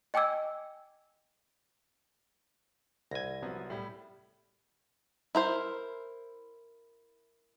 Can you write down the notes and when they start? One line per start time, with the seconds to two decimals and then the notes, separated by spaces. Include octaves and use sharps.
0.14 D#5 G5 G#5 D6 E6 G#6
3.11 C2 G#5 G#6 A#6
3.42 F3 F#3 B3
3.70 A2 G3
5.35 E4 A#4 C5